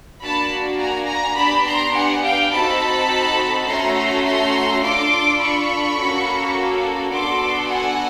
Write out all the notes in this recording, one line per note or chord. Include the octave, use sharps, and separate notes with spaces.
A#3 D4 F#4 A5 B5
G#5 A#5
G#5 A#5
B3 D4 G4 A5 B5
A#5 C6
F#5 G#5
F5 G5
C4 D#4 F#4 A4 A5 B5
A3 C#4 F#4 A4 A#5 C6
A#5 C6
D4 F4 A4 C6 D6
B5 C#6
A#3 C#4 F#4 A4
B3 D4 F#4 A4 C6 D6
F#5 G#5